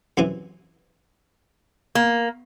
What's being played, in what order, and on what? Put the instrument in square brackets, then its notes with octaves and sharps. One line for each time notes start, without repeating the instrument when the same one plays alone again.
[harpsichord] F#2 C3 E3
[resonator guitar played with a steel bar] A#3